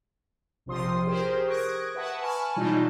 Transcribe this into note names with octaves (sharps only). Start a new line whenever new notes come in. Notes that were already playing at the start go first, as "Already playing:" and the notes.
A#1 C3 F3 C6 D#6
G4 G#4 A#4 C5
C#6 D#6 F#6 G#6 A#6 D7
B4 E5 F#5 A5
G#5 A5 B5 C#6 F6
B2 E3 F#3 G3 D#4 F4